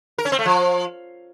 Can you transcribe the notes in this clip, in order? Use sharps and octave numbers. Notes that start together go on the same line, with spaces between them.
A#4
C#4
C4
A3
F3